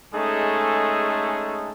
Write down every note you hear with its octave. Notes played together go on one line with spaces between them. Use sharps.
G#3 A3 C#4 D#4 G#4 A4